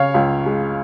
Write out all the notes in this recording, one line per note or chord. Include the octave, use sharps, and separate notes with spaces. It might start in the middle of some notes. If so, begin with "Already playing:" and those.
Already playing: C#3 C#5 F5
C#2
G#3